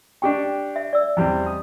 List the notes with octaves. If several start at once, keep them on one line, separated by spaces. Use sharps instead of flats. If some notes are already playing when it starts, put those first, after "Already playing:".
D4 G4 G5 C#6
E5
D5 E6
E2 G3 C4
D#6